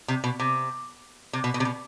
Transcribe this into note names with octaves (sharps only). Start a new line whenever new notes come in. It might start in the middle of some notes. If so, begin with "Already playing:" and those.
C3
B2
C3
C3
B2
B2
C3
B2